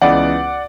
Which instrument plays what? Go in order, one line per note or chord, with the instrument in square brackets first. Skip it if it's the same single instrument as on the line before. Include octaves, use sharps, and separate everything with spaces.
[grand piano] C#2 C#3 E3 B3 D5 F#5